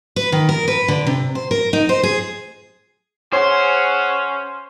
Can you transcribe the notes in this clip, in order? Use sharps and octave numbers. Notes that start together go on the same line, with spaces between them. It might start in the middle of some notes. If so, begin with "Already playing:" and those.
B4
D#3
A#4
B4
D3
C3
C5
A#4
D#4
C5
G#4
C#4 G#4 C5 C#5 F#5